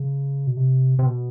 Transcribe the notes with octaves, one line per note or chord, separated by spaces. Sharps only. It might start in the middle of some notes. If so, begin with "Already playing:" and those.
Already playing: C#3
B2
C3
C3
B2